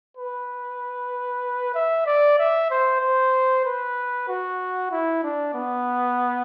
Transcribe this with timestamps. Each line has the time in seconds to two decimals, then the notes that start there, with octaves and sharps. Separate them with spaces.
0.17 B4
1.75 E5
2.06 D5
2.39 E5
2.71 C5
3.01 C5
3.65 B4
4.29 F#4
4.92 E4
5.23 D4
5.54 B3